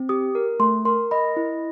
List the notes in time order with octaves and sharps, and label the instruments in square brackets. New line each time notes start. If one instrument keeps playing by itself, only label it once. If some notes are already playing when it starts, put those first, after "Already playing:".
Already playing: [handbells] C4
[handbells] G4 [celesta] D#6
[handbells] A#4
[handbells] A3 [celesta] C6
[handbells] A#4 [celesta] C6
[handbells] D#5 [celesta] B5
[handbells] E4